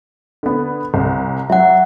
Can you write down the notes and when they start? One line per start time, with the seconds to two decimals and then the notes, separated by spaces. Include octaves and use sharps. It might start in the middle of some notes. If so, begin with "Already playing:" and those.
0.43 D3 B3
0.94 C2
1.50 F#3 E5 F#5